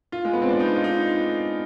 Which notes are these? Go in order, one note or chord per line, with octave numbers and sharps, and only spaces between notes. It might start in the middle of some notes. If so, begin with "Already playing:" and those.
F4
G#3
B3
C4
D4
D#4
F4
D#4